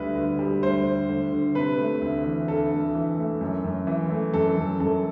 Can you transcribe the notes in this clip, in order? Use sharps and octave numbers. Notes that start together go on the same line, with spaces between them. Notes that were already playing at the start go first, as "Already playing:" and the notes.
Already playing: D2 G3 B4
D2
G3
D2 C5
D3
D2
D3
C3 B4
A3
D2
E3
D2 A4
D2
E3
A3
F#2
F#2
E3
A3
F#2 A4
F#2
F#2 A4